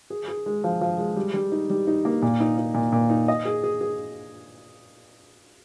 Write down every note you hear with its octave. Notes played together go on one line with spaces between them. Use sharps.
G#4
G#4
G#3
F3
F3
G#3
G3
G3
D#4
G3
D#4
A#3
A#2
D#4
D#4
A#2
A#2
D#4
D#5
G#4
G#4
G#4